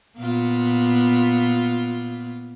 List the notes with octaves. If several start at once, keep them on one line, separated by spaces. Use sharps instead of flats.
A#2 B3 F4